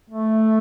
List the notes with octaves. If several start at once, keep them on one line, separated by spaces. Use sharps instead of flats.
A3